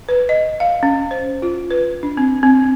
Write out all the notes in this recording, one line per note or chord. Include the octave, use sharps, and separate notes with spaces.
B4
D#5
F5
C#4
C5
F4
B4
D4
C4
C4